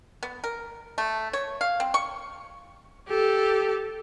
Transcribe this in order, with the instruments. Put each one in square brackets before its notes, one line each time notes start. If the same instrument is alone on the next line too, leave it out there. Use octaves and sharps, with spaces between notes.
[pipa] B3
A#4
A3
C#5
F5
C4
C#6
[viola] G4 A4